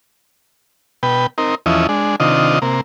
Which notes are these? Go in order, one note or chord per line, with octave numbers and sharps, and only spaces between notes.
B2 B4 G5
C4 D#4 A#4
E2 F3 C#4 E4 D#5
G#3 D4
C3 D#3 D4 F4 D#5
C3 A#3